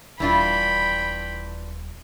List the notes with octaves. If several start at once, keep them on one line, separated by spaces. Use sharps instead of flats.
D#1 E3 D4 F4 G5 B5